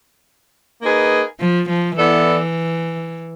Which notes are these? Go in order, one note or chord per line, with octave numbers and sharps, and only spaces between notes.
A#3 D#4 G#4 B4
F3
F3
E3 B3 E4 A4 D5